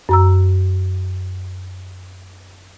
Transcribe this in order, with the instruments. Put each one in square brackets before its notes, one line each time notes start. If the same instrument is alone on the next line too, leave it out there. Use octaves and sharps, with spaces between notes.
[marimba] F#2 A#5 E6